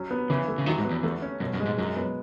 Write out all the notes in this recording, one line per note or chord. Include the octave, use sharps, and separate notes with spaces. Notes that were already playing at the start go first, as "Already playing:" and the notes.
Already playing: F#3 C#4
B3
C#3 E3
A3
C#3
D#3 F#3
G#2
B3
E2
E2 A3
C#4
F#2 B2
F#2
G#3
G#2
F#2 F#3
B3